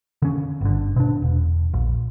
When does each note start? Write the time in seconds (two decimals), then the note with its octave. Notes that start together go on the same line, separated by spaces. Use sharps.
0.22 D3 C#4
0.61 G1 D3
0.96 B2 D4
1.22 E1
1.74 A#1